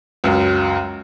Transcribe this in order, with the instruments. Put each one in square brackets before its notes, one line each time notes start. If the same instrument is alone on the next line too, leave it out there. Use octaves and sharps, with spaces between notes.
[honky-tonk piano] C#2 F#2